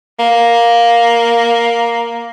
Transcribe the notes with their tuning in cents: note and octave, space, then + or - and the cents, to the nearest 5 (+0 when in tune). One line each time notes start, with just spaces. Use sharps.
A#3 +5